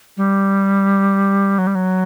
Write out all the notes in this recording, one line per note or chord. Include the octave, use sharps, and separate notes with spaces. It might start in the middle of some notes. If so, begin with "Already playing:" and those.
G3
F#3
G3
F#3